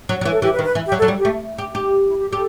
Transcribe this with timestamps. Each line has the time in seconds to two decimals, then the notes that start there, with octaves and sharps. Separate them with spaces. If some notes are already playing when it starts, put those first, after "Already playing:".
0.09 F#3
0.21 F#3
0.25 E3
0.32 A4
0.42 E3 G4
0.54 B4
0.59 D#3
0.64 B4
0.75 E3
0.86 G4
0.92 F#3
0.98 A4
1.02 F#3
1.08 G3
1.19 G4
1.25 A3
1.58 G4
1.75 G4
2.08 E4
2.19 G4
2.30 G4 A4